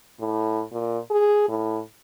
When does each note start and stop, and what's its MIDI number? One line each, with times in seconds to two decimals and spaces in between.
0.20 0.62 45
0.72 0.99 46
1.11 1.47 68
1.48 1.81 45